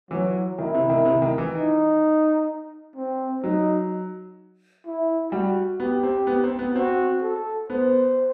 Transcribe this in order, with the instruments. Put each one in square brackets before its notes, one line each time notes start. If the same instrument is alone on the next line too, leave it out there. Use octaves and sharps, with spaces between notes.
[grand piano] E3 [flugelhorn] F#3
[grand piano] D#3 [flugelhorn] E4
[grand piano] C3
D#3
C3
D#3
E3
[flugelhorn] D#4
C4
[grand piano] F#3 [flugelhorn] D#4
[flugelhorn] E4
[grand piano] G3 [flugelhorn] F#4
[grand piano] B3 [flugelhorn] G4
[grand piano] C4
B3
C4
B3
[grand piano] C4 [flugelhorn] F#4
[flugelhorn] A4
[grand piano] B3 [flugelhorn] C5